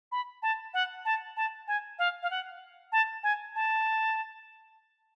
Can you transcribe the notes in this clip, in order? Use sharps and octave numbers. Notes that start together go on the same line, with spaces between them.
B5
A5
F#5
A5
A5
G#5
F5
F5
F#5
A5
G#5
A5